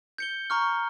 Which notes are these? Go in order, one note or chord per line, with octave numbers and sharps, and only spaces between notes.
G6 C#7 G7
A#5 C#6 F6